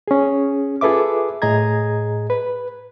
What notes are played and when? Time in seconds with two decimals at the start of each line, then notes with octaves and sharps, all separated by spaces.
0.08 C#4 G#4
0.81 F4 G#4 A4 B4 E5 D6
1.42 A2 G#4 D#5 A#5 G#6
2.30 B4